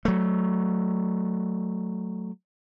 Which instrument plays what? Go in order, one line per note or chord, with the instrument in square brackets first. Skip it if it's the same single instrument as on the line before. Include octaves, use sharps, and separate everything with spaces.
[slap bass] F#3 A3